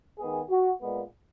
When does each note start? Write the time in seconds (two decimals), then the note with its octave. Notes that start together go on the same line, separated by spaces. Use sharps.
0.19 D#3 G#3 B3 G#4
0.50 F#4
0.80 A#2 G#3 B3